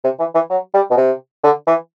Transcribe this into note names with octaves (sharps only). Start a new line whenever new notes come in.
C3
E3
E3
F#3
G3
B2
C3
D3
E3